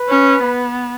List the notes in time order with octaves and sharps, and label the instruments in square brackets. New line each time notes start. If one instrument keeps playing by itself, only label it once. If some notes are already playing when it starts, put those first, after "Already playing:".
Already playing: [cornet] B4
[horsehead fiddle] C#4
B3